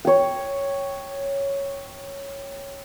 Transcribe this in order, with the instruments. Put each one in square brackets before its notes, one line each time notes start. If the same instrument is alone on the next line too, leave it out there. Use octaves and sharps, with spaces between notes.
[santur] C#5 G5